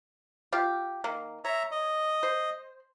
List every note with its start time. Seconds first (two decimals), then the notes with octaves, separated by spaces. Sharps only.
0.53 F4 G4
1.04 D#3 A#3
1.45 C#5 E5 A#5
1.71 D#5
2.23 C5